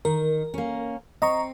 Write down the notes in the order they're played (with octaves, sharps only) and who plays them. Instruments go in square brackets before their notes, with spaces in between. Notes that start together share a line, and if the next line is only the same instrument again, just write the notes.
[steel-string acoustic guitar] D#3 [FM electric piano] A#4
[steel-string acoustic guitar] A#3 C#4
[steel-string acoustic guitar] C4 [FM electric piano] D#5 A#5 C#6